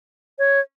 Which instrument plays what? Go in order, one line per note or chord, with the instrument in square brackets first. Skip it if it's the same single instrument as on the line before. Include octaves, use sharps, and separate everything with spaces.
[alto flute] C#5